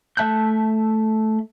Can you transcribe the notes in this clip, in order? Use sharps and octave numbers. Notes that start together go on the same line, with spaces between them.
A3 E5 A5 F#6 G6